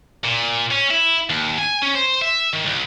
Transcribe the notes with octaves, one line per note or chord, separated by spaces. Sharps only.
A#2
C#4
E4
D#2
G#5
C#4
C5
E5
D#3
C2